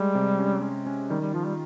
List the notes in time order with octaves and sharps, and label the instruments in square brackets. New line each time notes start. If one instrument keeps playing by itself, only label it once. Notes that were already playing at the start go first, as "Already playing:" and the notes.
Already playing: [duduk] G3 [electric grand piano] G#3
[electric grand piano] C3
C#4
C#4
C#4
[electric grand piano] D#3 [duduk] G3
[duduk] G3
[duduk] F3 [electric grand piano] F4
[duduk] G3